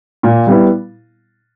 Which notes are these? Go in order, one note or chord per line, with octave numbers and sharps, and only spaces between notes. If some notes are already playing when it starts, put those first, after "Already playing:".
A#2
G3 B3 E4